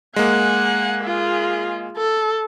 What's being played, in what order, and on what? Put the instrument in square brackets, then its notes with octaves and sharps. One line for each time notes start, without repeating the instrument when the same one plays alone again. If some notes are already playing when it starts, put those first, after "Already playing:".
[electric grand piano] G#3 A#3 [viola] F#5 G#5
[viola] F4 G#4
A4